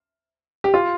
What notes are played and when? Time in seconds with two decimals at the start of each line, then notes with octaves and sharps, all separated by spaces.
0.64 G4
0.74 F4